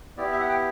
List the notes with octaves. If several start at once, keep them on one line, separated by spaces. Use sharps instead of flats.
B3 E4 G4 D5
E5
F#5
G5